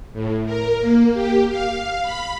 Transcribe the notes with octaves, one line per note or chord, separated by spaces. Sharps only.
A2
A#4
A#3
G4
F5
B5